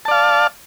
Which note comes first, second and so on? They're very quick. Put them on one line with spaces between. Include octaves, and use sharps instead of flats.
A5 D5 F5